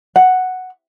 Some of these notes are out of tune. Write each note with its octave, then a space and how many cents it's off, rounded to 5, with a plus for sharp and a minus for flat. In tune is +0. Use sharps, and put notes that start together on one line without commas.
F#5 +0